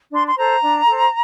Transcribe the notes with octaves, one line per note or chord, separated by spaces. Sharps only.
D4 C6
C6
A4 C5 A#5
D4
A4 C5